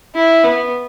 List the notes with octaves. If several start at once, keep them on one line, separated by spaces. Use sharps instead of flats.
E4
B3